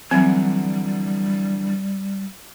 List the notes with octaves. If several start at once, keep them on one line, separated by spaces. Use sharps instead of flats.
D3 E3 F#3 G3 C4